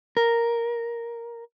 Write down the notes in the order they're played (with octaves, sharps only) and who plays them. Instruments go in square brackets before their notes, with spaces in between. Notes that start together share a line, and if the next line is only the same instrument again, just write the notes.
[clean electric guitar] A#4